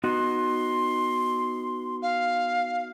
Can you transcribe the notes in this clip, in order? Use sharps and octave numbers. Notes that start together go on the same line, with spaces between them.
B3 D#4 F#4 C6
F5